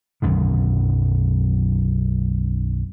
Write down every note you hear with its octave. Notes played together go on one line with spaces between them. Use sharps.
B1 F#2 D3 D#3